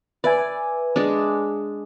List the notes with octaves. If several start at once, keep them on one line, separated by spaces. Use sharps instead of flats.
B4 D5 E5 G#5
G#3 D4